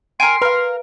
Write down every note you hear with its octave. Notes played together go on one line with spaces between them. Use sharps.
A#4 G#5 C6 D7
A#4 B4 F5